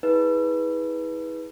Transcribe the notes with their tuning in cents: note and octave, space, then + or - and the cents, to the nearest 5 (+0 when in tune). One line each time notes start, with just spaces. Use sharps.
E4 -40 G#4 -10 B4 -10